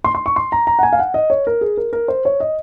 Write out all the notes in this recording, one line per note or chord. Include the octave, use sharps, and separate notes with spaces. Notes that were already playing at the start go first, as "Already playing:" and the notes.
C6
C6
C#6
C6
A#5
A#5
F#5
G#5
F5
F#5
D#5
C#5
A#4
G#4
A#4
A#4
C5
C#5
D#5